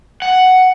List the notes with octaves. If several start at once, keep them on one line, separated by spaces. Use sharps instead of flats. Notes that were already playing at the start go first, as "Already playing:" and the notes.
F#5